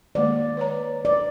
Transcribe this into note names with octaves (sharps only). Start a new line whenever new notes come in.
D#3 G#3 A#3 D5
B4 C#5 A#5
D5